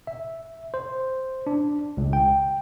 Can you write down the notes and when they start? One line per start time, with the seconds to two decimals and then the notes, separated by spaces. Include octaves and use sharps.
0.07 E5
0.74 C5
1.47 D4
1.97 C#2
2.13 G5